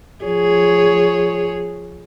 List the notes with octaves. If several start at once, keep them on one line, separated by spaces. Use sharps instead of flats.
F3 G#4 C#5